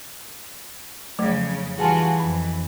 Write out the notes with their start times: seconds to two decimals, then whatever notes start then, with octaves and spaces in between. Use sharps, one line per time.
1.19 F2 C#3 F3 F#3 A3
1.79 E3 G3 F4 F#4 G#4 G#5 A5
2.19 F2 B5